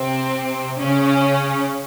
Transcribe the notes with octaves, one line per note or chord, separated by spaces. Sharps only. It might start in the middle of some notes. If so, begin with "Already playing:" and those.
Already playing: C3 C4
C#3 C#4